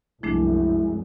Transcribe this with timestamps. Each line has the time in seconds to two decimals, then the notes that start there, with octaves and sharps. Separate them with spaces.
0.23 C2 F#2 F3 G#3 A3 D4 E4